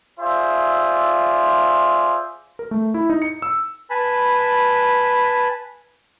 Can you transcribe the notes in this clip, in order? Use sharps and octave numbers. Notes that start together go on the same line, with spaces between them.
F4 G#4 C5 D5 E5
A#4
A3
E4
D#4
C#7
E6
B4 G#5 A5 B5